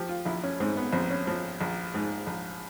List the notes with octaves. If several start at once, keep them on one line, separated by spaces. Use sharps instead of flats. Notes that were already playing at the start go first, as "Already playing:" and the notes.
Already playing: F3 G4
F4
A#1 E4
C#4
G#2 C4
B3
A#1 C4
C#4
F3
A#1
G#2
A#1